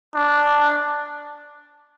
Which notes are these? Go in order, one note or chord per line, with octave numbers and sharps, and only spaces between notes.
D4